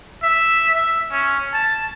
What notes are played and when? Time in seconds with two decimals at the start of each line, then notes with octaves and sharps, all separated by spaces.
0.23 E5
0.75 E5
1.11 C#4
1.53 A5